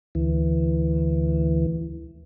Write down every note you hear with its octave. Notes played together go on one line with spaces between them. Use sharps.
D2 E3